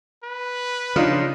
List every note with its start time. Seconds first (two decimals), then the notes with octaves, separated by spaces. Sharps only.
0.24 B4
0.96 C#3 F3 D4 D#4 F4 D5